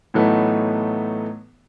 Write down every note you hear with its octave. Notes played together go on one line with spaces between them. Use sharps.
A2 E3 F#3 A3 B3 D#4